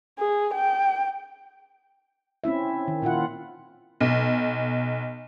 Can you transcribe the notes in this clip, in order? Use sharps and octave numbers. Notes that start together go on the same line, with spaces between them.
G#4
G5
C4 C#4 E4 E5
D#3
A#2 E4 F4 F#5
B1